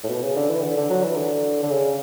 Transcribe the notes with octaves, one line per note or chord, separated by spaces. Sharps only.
A2
B2
C#3
D3
E3
D3
D3
F#3
E3
D3
D3
C#3